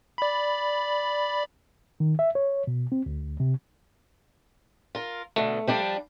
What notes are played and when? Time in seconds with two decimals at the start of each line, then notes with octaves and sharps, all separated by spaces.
0.18 D5 B5
2.00 D#3
2.19 E5
2.35 C#5
2.67 B2
2.92 C4
3.06 D2
3.40 C3
4.95 F4 A#4
5.36 B2 D3 A3
5.67 F3 G3 D4